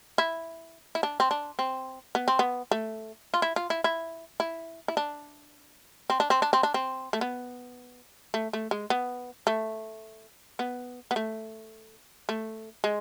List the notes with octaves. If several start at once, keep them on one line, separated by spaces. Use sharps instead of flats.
E4
E4
D4
C4
D4
C4
B3
C4
B3
A3
F4
E4
F4
E4
E4
E4
E4
D4
C4
D4
C4
D4
C4
D4
C4
A3
B3
A3
A3
G#3
B3
A3
B3
B3
A3
A3
G#3